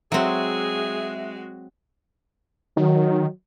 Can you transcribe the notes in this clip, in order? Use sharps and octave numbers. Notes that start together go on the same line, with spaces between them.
F#3 G#3 C4 F#4 G#4 E5
D#3 F#3